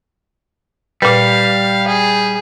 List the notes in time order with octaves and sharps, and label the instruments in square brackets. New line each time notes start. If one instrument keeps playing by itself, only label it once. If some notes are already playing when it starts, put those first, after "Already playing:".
[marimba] A#2 B4 [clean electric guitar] G3 [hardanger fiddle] F5
[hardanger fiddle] G#4